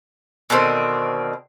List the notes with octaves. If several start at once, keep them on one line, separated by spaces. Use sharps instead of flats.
B2 D3 D#3 C4